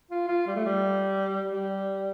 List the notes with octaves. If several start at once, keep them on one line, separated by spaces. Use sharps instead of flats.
F4
F4
G3
A3
G3
G3